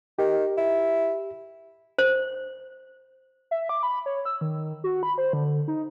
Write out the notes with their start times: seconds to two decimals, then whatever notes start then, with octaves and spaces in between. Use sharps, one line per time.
0.19 D#3 G4
0.57 E4
1.98 C5
3.51 E5
3.69 D6
3.83 B5
4.06 C#5
4.25 E6
4.41 D#3
4.84 F#4
5.03 B5
5.18 C5
5.33 D3
5.68 D#4